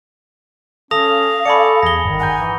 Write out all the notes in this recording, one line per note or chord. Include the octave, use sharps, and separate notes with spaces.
C#4 A4 F5 D#6 A#6 F7
A4 D5 G#5 B5 C#6 C#7
E2 G#4 A#6 G7
G1 D#3
F#5 G#5 A#5 G6
E3